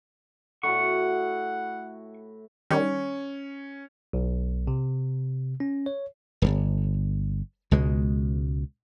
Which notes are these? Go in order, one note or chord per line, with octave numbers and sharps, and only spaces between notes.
A2 E4 F#4 F#5 C#6
D#3 G3 C#4
B1
C3
C#4
C#5
D1 G1
C#2 B2 G#3